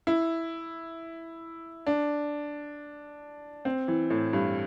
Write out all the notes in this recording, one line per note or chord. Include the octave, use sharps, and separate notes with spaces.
E4
D4
C4
E3
A2
G2